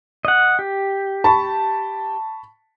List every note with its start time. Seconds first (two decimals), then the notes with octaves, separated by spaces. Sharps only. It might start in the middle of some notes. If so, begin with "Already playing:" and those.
0.25 D#5 F#5
0.59 G4
1.24 A5 B5 C#6